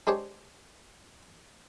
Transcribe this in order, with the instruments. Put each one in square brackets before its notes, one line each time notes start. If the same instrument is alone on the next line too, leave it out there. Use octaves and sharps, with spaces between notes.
[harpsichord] G#3 D4 G4 C5 C#5